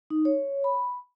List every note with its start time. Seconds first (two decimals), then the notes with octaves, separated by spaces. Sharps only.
0.10 D#4
0.25 C#5
0.64 B5